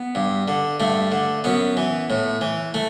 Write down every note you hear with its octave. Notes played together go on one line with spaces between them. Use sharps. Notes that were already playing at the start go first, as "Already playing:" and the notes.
Already playing: B3
G2
D3
G2 A3
D3
F#2 B3
E3
A2
E3
A3